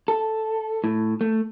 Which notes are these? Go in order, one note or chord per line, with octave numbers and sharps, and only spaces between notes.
A4
A2
A3